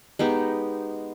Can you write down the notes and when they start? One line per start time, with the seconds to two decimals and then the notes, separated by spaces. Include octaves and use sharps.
0.19 G#3 B3 D#4 G4